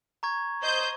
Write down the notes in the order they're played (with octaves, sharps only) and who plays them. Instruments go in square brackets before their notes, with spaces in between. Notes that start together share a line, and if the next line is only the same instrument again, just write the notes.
[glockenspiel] A#5 C#6 G#6
[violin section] C5 D#5 G6